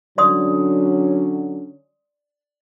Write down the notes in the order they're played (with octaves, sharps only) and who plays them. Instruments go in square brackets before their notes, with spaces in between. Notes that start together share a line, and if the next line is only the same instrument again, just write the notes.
[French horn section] D3 F#3 C#4 [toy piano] D5 C6 D#6